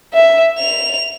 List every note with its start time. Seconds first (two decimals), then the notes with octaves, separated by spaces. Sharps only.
0.14 E5
0.59 F7